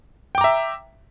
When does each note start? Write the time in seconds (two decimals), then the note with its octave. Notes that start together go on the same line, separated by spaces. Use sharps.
0.35 G5
0.38 D6
0.41 A#5
0.44 E5